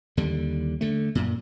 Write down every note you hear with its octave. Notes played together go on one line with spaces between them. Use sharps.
D#2 D3 G3
D3 A3
F#2 A#2